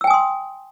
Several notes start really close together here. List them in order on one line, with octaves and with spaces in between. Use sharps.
E6 G5 G#5 D#6 C6